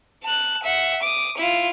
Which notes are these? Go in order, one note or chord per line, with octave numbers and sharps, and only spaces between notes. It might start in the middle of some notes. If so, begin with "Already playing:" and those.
A5 F#6
E5 F#5
D6 D#6
E4 F4